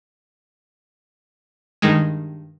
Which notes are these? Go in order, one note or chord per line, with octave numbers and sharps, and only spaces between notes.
G2 D#3 G#3